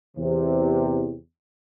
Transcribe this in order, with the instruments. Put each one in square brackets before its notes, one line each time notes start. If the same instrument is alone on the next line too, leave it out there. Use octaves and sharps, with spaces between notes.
[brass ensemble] E2 C3